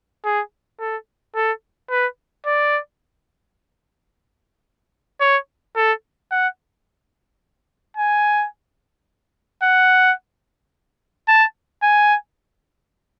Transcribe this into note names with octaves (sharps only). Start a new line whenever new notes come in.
G#4
A4
A4
B4
D5
C#5
A4
F#5
G#5
F#5
A5
G#5